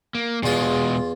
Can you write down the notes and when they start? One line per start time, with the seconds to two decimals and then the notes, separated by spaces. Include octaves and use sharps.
0.15 A#3
0.43 E2 B2 G#3 F4